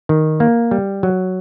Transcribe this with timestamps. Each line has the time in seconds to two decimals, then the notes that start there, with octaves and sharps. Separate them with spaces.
0.09 D#3
0.40 A#3
0.71 G3
1.03 F#3